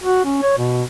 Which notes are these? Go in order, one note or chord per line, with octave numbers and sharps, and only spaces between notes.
F#4
C#4
C#5
B2